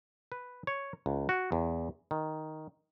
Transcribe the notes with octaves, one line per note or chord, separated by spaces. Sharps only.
B4
C#5
C#2
F#4
E2
D#3